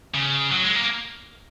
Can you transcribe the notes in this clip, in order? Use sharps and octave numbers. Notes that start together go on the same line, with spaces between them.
C#3
F#3
G#3
A#3